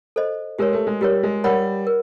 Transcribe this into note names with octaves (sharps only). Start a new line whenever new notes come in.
A4 C5 D#5
G#3 G4 A#4 C#5
A3
G#3
G3 G4 A#4 C#5
G#3
G3 A#4 C#5 F#5 B5
A#4